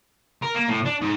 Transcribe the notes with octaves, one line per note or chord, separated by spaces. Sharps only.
A#4
A#3
A2
D4
G#2